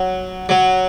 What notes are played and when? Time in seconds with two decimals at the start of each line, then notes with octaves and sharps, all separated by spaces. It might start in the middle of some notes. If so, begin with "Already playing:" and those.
Already playing: F#3
0.49 F#3